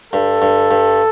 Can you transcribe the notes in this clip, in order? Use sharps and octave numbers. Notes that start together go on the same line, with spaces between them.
G2 A4
G2
G2